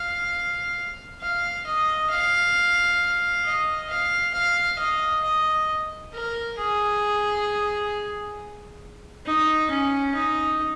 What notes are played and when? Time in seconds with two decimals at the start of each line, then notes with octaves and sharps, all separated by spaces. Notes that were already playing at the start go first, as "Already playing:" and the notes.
Already playing: F5
1.21 F5
1.66 D#5
2.10 F5
3.44 D#5
3.89 F5
4.34 F5
4.79 D#5
5.24 D#5
6.13 A#4
6.58 G#4
9.26 D#4
9.70 C#4
10.14 D#4